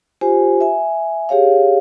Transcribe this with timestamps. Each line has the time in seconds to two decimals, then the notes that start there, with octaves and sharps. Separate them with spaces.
0.21 F4 G4 C5 G#5
0.61 E5 G#5
1.29 G4 G#4 C#5 F5